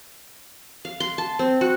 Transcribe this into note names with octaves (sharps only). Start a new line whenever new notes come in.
F5
C6
A5
C4
F#4